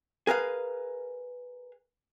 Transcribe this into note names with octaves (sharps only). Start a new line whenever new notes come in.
G#4 A#4 B4 F5